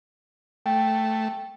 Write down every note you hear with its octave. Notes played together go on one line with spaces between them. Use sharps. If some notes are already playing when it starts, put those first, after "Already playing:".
A3 G5